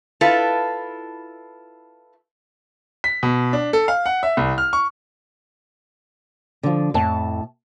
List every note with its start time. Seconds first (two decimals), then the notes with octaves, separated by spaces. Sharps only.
0.21 E4 F4 A4 B4
3.04 B6
3.23 B2
3.53 D4
3.73 A4
3.88 F5
4.06 F#5
4.23 E5
4.37 C2
4.58 F6
4.73 C#6
6.63 D3 F3
6.94 F2 A2 A5